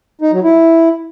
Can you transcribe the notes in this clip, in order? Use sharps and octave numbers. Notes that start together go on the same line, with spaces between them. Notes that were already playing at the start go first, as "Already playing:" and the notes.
D#4
F#3
E4